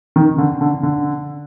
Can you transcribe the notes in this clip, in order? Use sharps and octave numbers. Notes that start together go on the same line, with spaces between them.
D#3
D3
D3
D3